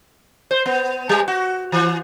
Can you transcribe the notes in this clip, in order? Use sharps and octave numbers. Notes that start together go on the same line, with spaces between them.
C5
B3
G3
F#4
E3